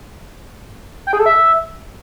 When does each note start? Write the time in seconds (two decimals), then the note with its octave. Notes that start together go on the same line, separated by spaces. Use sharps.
1.07 G5
1.13 G#4
1.19 A4
1.26 E5